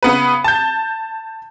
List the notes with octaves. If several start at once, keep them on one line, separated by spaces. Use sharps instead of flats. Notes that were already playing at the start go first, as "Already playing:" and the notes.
C#3 B3 B4
A5 G6